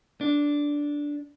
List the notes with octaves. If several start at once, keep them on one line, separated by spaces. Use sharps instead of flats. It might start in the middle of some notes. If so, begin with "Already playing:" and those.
D4